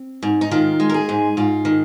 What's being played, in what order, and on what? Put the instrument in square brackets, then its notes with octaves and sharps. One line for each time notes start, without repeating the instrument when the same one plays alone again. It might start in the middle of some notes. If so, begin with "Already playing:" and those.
Already playing: [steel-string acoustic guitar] C4
G#2
D#4
D#3 F4
G#3
A#4
G#4
G#2
G#2 F4
D#3